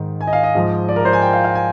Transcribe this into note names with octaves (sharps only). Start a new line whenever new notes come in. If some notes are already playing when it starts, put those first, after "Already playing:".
Already playing: G#2 D#3
G#5
D#5
F5
D#5
G#2 F3
D5
A#4
C5
G#5
G5
F5
F5
G#5